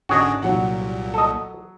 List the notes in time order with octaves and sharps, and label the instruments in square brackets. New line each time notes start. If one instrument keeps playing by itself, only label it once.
[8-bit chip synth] G#1 D3 D4 [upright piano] C#4 [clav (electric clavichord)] F#4 G#4 D#5
[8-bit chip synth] C2 A#2 [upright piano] F#3 F#5
[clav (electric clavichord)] A4 D#5